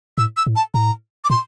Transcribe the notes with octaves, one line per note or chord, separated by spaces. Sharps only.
A2 E6
E6
A2
A5
A2 A#5
D6
A#2 C6